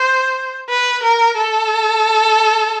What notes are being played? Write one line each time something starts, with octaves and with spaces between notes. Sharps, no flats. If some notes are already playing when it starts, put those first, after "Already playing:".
Already playing: C5
B4
A#4
A4